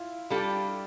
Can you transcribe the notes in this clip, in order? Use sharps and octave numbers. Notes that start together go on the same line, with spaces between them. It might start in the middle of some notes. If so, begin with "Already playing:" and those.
Already playing: E4 F4
G3 D4 F4 G4 A4